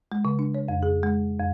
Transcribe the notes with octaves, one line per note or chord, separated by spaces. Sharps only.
G#3
C#3
D4
C#5
F2
G#4
G#3
F2